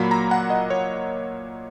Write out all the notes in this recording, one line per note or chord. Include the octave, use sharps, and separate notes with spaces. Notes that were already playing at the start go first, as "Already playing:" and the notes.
Already playing: A#2 F#3 A#3 B5
A#5
F#5
D#5
C#5